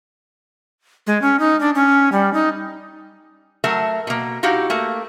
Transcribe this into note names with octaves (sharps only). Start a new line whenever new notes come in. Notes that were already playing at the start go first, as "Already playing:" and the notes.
G#3
C#4
D#4
D4
C#4
G3
D#4
F#3 A3 A#4 E5
B2 A#3
D#4 E4 F#4 G4 F5
A3 A#3